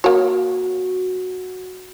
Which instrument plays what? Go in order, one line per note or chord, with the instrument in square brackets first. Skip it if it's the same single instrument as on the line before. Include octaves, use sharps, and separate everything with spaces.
[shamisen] A#3 C#5 [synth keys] F#4